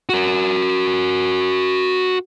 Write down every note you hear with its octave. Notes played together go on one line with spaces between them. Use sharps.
F#4 A#4